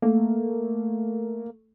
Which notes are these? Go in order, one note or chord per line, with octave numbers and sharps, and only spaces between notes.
A3 A#3